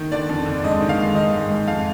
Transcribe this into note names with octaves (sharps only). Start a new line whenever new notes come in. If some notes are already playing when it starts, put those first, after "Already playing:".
Already playing: D#3
D3 D5
F2
D3
G#2 D#5
D#3
F5
G#2
D#3 D#5
G#2
G#2
F2 F5